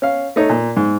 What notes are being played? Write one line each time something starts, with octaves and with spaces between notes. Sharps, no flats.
C#4 F5
A3 D#4 C#5
A#2
G#2